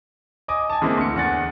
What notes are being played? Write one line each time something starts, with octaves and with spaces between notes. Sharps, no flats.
D#5 G#5 D6 D#6
G#5 A5
D3 E3 G#3 A#3 C4
D2 C#7
E2 D4 F#5 G#5 A6